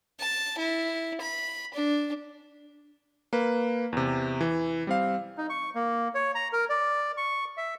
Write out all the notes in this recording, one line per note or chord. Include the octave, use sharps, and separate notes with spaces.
A5
E4
B5
D4
A#3 B4
E2 C3
E3
G3 C4 F5
D#4
C#6
A#3
C#5
A#5
A#4
D5
C#6
E5